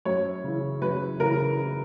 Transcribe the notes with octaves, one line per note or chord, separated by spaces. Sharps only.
F#2 C#5
C#3 E3
F#2 B4
C#3 E3 A#4